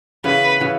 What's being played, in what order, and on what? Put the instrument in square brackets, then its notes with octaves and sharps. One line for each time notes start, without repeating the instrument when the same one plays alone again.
[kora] C#3 E3 B3 [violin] B4
[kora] C#3 E3 B3